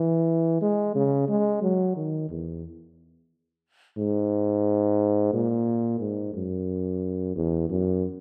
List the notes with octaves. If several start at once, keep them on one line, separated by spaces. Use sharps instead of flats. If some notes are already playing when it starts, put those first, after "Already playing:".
Already playing: E3
G#3
C#3
G#3
F#3
D#3
E2
G#2
A#2
G#2
F#2
E2
F#2